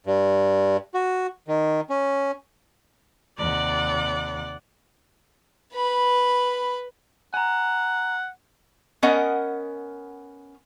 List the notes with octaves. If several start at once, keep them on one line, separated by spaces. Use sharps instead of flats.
G2
F#4
D#3
C#4
D#2 C3 D5 F#5
B4 B5
F#5 G#5 A#5
B3 C#4 A#4 D#5 F#5